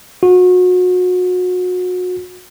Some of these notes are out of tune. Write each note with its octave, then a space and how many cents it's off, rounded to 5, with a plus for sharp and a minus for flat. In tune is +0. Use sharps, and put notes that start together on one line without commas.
F#4 -30